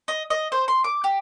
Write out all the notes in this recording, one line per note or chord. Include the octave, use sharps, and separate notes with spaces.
D#5
D#5
C5
C6
D6
G4